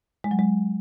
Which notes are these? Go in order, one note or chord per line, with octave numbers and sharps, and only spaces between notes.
G#3
F#3
G#3